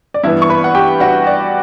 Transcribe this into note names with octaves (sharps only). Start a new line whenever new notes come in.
D5
G2 E3 B3 E4 E5
C#6
B4 B5
F#5
G4 G5
F#4 F#5
D5